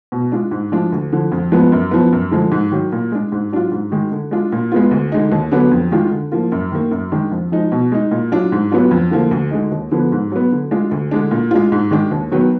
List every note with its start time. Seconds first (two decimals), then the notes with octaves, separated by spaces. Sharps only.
0.12 B2
0.32 G#3 D4 F4
0.51 G#2
0.72 F3 G#3 D4 F4
0.92 D2
1.12 D3 F3
1.32 F2
1.52 F3 G#3 B3
1.72 F#2
1.91 F3 B3
2.13 F#2
2.31 D3 F3 G#3
2.52 G#2
2.71 D#3 F#3
2.92 A#2
3.12 G#3 D4
3.32 G#2
3.52 F#3 D4 F4
3.72 G#2
3.92 D#3 G#3
4.12 D3
4.31 G#3 D4 F4
4.52 A#2
4.72 G#3 B3 F4
4.91 D2
5.12 D3 G#3 D#4
5.32 D#2
5.52 D3 F#3 B3 D4
5.71 F2
5.91 D#3 G#3 D4 F4
6.11 D3
6.32 F3 A#3 F4
6.52 F#2
6.72 D#3 A#3
6.91 F#2
7.12 D#3 G#3 D4
7.31 F2
7.52 F3 G#3 D#4
7.72 B2
7.92 G#3 D#4
8.11 A#2
8.32 F#3 D4 F4
8.52 G#2
8.72 F#3 B3 D4 F4
8.91 F2
9.11 D3 F3 A#3 F4
9.31 D2
9.51 D3 G#3 D#4
9.72 D#2
9.91 D3 F3 B3 D4
10.12 G#2
10.32 F#3 B3
10.52 D3
10.71 G#3 D4 F4
10.91 D2
11.11 D3 G#3 D4
11.31 A#2
11.51 G#3 D4 F4
11.72 G#2
11.91 D#3 G#3 D4
12.11 D#2
12.31 D#3 F#3 B3